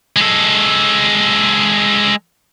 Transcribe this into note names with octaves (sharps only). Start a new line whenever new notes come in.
G#3 A4